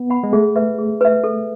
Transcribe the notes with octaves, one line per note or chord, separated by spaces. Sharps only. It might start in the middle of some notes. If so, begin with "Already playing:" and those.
Already playing: B3
F#5 B5
G#3
A3 G#4
B4 E5
G#4
B4 E5
A4